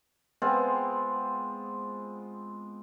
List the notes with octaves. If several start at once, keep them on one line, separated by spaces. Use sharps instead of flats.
G#3 B3 C4 F4